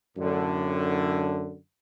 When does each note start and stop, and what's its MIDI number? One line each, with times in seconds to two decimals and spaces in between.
0.17 1.55 42
0.17 1.55 45
0.17 1.55 50